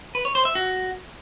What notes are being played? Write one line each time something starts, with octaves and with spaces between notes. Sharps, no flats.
B4
C#5
C5
E5
F#4